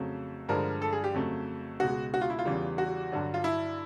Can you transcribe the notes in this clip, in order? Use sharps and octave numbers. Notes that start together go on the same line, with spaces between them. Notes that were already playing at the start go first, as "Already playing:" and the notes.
Already playing: F2 C#3 F#3 A3
G2 D3 F3 G#3 A#4
A4
G#4
G4
F2 C#3 F#3 A3
C#2 B2 G#3 F#4
F#4
F4
E4
F4
E2 C#3 E3 G3
F#4
G2 D3 F#3
F4
E4